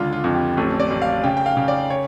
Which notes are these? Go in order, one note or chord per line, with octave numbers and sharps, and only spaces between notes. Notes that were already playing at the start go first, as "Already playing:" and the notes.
Already playing: C#2 D3 F4
F4
F2
G4
A1 A4
D5
A1
F5
C#3 G5
G5
F5
C#3
D5
C#5